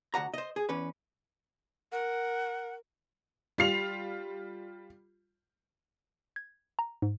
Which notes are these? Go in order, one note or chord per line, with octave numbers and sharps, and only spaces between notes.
D2 F#4 F#5 A#5
C5 D#5
G#4
E2 C#4 B4
A#4 F#5
G3 F4 C7 F7
G#6
A#5
G#2